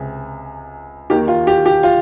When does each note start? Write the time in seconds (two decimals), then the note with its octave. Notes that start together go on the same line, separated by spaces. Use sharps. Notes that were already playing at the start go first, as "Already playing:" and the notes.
Already playing: C#2 C3 G#4
1.10 D#2 D#3 A#3 G4
1.28 F4
1.47 G4
1.66 G4
1.83 F4